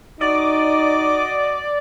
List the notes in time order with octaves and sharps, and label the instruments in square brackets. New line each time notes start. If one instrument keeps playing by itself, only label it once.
[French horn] D#4 [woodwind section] F#4 D#5 D6 [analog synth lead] D5